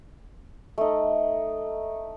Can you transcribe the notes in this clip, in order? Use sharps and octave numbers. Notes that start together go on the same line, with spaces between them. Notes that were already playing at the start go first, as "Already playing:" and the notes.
A3 D#4